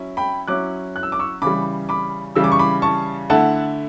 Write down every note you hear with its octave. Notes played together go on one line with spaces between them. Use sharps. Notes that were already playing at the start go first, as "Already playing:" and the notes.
Already playing: F#3 C#4 E4
G5 B5
F#3 C#4 E4 D6 F#6
F#6
E6
D6
C#6 E6
C#3 E3 G3 B5 D6
B5 D6
C#3 E3 G3 E6
D6
C#6
B5 D6
A5 C#6
D3 A3 E4 F#5 A5